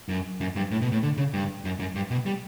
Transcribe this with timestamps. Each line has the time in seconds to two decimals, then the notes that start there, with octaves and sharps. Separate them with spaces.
0.09 F#2
0.41 F#2
0.56 G2
0.71 A2
0.82 B2
0.92 A2
1.03 D3
1.17 C#3
1.33 G2
1.65 F#2
1.79 F#2
1.95 G2
2.11 B2
2.26 G3